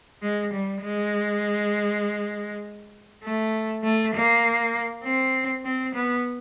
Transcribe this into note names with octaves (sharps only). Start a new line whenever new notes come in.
G#3
G3
G#3
A3
A3
A#3
C4
C4
B3